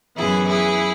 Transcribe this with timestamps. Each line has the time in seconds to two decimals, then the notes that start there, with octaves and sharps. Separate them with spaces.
0.17 F#2 E3 B3 E4 G#4
0.48 E4 G#4